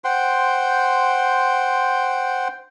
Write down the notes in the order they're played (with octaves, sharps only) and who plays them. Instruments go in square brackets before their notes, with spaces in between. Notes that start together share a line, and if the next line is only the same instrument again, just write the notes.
[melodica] C5 F#5 G5 C6